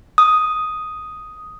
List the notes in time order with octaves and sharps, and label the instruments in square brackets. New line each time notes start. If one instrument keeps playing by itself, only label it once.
[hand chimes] D#6